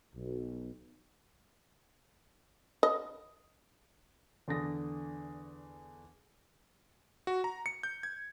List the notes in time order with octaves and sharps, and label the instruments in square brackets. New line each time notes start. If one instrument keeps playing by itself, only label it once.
[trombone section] B1
[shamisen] D#5
[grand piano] E2 D3 D#6 A#6
[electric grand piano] F#4
A#5
C#7
G6
G#6